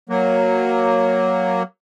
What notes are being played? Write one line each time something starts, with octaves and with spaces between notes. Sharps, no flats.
F#3 A#3